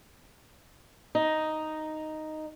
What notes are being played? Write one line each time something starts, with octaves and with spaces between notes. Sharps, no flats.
D#4